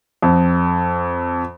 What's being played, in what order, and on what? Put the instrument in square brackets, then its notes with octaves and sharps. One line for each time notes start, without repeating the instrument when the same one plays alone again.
[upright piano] F2